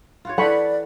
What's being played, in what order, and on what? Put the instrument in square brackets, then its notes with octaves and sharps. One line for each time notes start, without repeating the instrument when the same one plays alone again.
[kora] F4 F#4 C#5
[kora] E3 [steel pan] A4 B5 C#6 [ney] D5 [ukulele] F#5